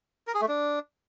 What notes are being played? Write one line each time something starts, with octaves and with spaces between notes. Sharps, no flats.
A#4
G#4
A3
D4